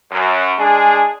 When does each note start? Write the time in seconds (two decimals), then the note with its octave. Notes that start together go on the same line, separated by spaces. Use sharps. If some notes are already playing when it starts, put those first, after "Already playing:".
0.11 F#2
0.58 G#3 D4 G#4